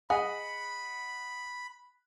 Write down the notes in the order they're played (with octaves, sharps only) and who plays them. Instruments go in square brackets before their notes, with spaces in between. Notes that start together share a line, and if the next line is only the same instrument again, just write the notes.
[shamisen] G#4 [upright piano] D#5 F#5 [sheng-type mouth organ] B5